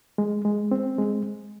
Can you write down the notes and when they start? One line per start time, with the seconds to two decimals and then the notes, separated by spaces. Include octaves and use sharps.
0.18 G#3
0.45 G#3
0.71 C4
0.98 G#3